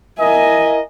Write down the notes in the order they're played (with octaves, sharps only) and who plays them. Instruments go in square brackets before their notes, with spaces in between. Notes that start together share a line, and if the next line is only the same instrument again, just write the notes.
[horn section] E4 A#4 D#5 [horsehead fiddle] E5 G#5